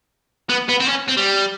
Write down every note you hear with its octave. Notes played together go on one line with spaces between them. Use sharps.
B3
B3
C4
C#4
C4
G3